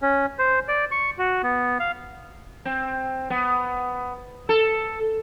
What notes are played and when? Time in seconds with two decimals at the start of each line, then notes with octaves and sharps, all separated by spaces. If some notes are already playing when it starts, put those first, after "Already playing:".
0.02 C#4
0.39 C5
0.68 D5
0.91 C#6
1.18 F#4
1.43 B3
1.80 F5
2.65 C4
3.30 B3
4.49 A4